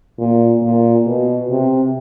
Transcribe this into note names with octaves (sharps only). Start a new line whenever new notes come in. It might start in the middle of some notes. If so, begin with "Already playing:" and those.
A#2
A#2
B2
C3